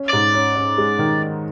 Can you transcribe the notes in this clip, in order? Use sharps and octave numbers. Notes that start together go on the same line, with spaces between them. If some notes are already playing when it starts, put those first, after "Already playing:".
Already playing: C#4
G#2 D5
C#4
C#4
G#3
D#3